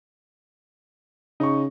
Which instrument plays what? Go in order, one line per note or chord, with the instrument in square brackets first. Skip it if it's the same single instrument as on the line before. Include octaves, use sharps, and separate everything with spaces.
[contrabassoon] C#3 [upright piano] D#4 C#6